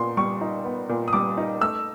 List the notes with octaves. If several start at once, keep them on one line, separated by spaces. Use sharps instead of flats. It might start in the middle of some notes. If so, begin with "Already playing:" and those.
Already playing: A#2 B3 C6
G3 C#6
D#4
B3
A#2
D#6
G3 D6
D#4
A3 E6